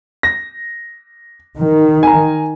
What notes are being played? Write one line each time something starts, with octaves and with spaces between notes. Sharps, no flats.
A#6
D#3
G#5 A#5